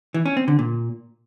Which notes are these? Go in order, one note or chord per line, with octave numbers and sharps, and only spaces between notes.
E3
C#4
C4
D3
A#2